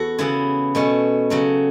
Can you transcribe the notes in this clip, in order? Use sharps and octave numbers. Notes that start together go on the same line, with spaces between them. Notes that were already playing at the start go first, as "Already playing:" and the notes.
Already playing: E2 F#4 A4
C#3 E3 B3 E4
B2 A3 C#4
C#3 F#3 A3